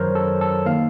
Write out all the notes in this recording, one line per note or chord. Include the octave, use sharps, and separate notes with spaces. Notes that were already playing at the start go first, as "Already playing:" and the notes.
Already playing: F#2 D#3 F#3 A#4 C5 C#5
A4
A4
D#3 A#3 F5